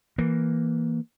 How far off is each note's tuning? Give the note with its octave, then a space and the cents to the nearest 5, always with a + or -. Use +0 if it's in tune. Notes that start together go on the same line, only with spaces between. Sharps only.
E3 +0 A#3 +0